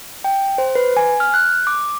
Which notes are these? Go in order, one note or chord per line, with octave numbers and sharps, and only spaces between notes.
G5
C5
B4
G#5
F6
F#6
D6